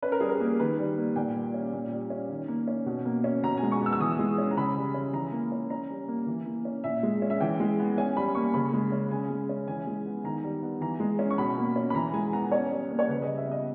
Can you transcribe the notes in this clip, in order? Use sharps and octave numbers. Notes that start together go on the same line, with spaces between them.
C#4 B4
A#4
G3 G#4
A#4
A#3
D#3 B4
G3
A#3
A#2 G5
G3
C#4
A#2
G3
C#4
D#3
A#3
C#4
B2
A#3
C#4
B2 A#5
G#5
G#3
C#6
B3 E6
E6
E3 D#6
G#3
C#4
A#5
C#3 B5
G3
C#4
E3 A#5
A#3
C#4
C#4 A#5
G3
A#3
E3
A#3
C#4
A#2 E5
G#3
C#4
E5
E3 G5
G#3
B3
C#4 G#5
G3 B5
A#3 C#6
C#3 B5
G#3
C#4
C#3 G#5
G#3
C#4
E3 G#5
G#3
B3
D#3 A#5
G3
B3
E3 A#5
G#3
C#4
C#6
B2 B5
A#3
C#4
B5
E3 A#5
G#3 G#5
B3 A#5
C#4 C#5
G3
A#3
C#5
C#3 B4
D#5
G3
E5
B3 D#5